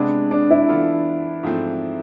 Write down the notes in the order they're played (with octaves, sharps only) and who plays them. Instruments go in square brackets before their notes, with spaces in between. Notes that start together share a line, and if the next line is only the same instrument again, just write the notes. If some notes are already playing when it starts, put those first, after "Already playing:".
Already playing: [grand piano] C3 G#3 B3 [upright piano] D4
[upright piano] D4
E4
[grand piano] E3 B3 F4 A4
G#2 F3 A3 C4